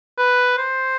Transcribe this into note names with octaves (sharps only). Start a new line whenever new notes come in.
B4
C5